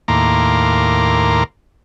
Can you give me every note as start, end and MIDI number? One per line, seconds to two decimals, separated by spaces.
0.08 1.44 39
0.08 1.44 45
0.08 1.44 58
0.08 1.44 82
0.08 1.44 84
0.08 1.44 86